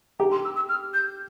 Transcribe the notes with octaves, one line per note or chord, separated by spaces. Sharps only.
G4 A#5
C6
E6
E6
F6
G6